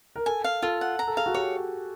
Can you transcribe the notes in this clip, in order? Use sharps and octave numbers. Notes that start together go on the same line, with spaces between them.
A#4
A4 G#5
F5
F4 A4
F#5
A#5
A4
G#4 F5
F#4
G4 C#5